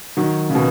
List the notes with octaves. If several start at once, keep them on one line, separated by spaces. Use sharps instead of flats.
D#3 F#3
C#3
B2